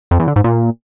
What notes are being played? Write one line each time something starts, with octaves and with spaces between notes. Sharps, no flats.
F2
E2
D3
G#2
A#2